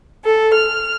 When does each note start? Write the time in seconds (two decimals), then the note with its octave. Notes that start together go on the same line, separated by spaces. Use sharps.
0.24 A4
0.54 F6